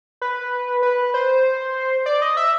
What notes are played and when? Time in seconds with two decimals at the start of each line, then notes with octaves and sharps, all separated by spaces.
0.22 B4
0.82 B4
1.14 C5
2.06 D5
2.22 D#5
2.37 E5